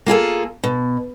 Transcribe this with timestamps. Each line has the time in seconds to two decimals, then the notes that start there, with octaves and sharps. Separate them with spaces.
0.06 A#3 F4 G#4 A4
0.64 B2